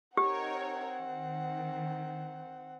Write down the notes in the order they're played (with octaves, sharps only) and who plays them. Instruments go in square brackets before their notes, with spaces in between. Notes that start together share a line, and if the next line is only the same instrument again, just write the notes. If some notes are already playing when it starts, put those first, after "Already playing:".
[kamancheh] C4 F#5 [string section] D#4 A#4 C#5 [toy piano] G4
[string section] D#3